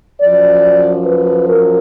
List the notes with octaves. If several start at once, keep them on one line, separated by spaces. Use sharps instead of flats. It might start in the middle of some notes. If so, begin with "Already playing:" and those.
F#2 F3 D5
B4
A#4